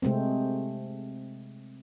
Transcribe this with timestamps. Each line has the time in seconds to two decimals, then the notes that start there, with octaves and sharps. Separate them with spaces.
0.02 C3 G#3 A3 C4